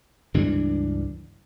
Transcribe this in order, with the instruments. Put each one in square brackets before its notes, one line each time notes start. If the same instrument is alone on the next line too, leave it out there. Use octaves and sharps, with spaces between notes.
[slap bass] C#2 G2 E3 D4